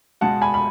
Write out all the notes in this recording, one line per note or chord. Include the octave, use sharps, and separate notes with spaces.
C#2 B2 G#3 F#5 A5
G#5 B5
B5